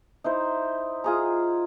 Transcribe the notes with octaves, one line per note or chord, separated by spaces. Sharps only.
D#4 E4 C5
F4 G#4 A#5